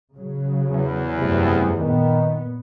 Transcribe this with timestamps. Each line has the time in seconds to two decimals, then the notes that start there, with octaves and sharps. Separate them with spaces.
0.15 C#3 F#3
0.70 E2
1.18 G1 F#2 C3 A3
1.77 A#2 D#3 B3